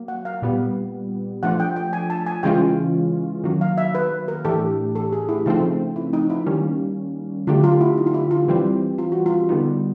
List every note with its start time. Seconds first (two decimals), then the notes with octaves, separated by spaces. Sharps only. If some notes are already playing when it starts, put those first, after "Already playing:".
Already playing: F#3 A#3
0.08 F#5
0.25 F5
0.42 A#2 G3 B3
1.43 F3 A3 D4 F4 F#5
1.60 G5
1.76 G5
1.93 G#5
2.10 A5
2.26 G#5
2.43 C#3 E3 G#3 C#4 F4 G5
3.44 D#3 F#3 A#3
3.61 F5
3.78 E5
3.95 B4
4.28 A#4
4.45 A2 E3 A3 D4 G4 A4
4.95 A4
5.13 G#4
5.29 E4
5.46 C#3 F3 A3 C4 D#4
5.96 E4
6.13 D#4
6.30 E4
6.46 D#3 G3 A#3 C#4
7.47 D3 F#3 A3 D4 F4 G4
7.64 F4
7.81 E4
7.98 D#4
8.07 F4
8.14 E4
8.31 F4
8.48 E3 G3 C4
8.98 F4
9.12 F#4
9.26 F4
9.49 D3 G3 B3 D#4